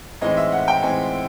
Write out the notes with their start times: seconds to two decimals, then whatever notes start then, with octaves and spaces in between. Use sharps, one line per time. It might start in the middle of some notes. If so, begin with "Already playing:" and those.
0.21 A2 E3 G#3 C4 D#4 D#5
0.37 E5
0.52 F#5
0.68 G5
0.82 A2 E3 G#3 C4 D#4 G#5